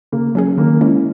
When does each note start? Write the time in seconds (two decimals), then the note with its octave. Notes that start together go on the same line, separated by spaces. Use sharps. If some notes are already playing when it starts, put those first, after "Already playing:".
0.12 C#3 A#3
0.35 F#3 C#4 G#4
0.58 D#3 A#3
0.81 G#3 C#4 E4